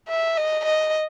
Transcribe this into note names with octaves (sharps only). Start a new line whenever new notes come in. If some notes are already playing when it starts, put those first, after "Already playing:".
E5
D#5
D#5